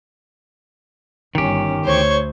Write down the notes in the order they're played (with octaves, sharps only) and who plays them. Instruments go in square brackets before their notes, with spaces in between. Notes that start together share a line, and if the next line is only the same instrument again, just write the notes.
[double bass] G1 C#4 [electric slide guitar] D#3 G4
[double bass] D2 [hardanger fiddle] C5 C#6 [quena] C#5